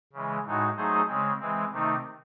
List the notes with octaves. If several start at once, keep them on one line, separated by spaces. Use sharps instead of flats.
C#3 E3 G#3
A2 G#3 D#4 F#4
F#3 A3 D#4 G#4 C5
C#3 G#3 C4
E3 G#3 C4
C3 D#3 A3 C4 D#4